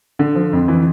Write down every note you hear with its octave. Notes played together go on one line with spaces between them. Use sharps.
D3
F3
F2
E3